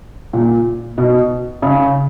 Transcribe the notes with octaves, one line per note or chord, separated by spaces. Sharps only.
A#2
B2
C#3